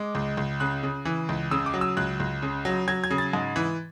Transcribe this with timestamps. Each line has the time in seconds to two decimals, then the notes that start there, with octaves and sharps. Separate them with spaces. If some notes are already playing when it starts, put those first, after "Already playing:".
Already playing: G#3 D6
0.15 C#2
0.37 C#2
0.60 C#3 F#6
0.83 C#3
1.05 E3
1.29 C#2
1.51 C#3 E6
1.66 D6
1.74 F#3
1.81 E6
1.97 C#2 F#6
2.20 C#2
2.42 C#3
2.65 F#3
2.88 F#3 G#6
3.04 G#6
3.11 C#3
3.18 A6
3.33 G#2
3.56 E3